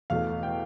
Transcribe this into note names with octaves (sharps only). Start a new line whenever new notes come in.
E2 B2 A3 F5
G5